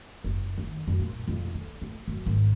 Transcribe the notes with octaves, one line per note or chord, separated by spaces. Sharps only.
F#1
D#3
F#2
A#2
F2
D3
A3
F#2
G#1